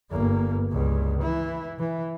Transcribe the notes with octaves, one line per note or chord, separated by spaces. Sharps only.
G1 A#3
C#2 G2
E3 E4
E3